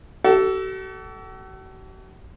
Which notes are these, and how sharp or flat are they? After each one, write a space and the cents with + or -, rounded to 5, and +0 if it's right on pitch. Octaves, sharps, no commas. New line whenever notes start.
F#4 +45 A4 +0